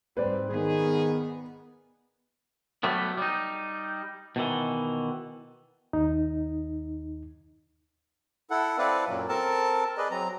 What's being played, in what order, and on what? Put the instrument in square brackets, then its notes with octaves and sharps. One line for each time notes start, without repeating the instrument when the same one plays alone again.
[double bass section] G#2 G3 C4 [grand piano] B4 C5 D5
[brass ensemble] D#3 G#4 [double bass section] B3
[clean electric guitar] F#3 G3 A3 B3
G3 D#4
B2 D#3 E3
[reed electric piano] D#2 D#4
[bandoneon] E4 A4 F#5
C4 E4 A4 B4 D5 F5
F#2 A#2 F#3
C4 A4 A#4 A5
G#4 B4 D5 D#5
F#3 C4 A#5